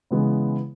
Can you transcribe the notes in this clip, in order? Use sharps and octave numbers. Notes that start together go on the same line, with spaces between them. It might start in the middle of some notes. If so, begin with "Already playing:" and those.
C#3 E3 G#3 B3